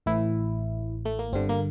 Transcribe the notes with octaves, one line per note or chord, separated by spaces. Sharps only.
A1 A2 E3 E4
A3
A#3
G1 G2 D3 C4
A#3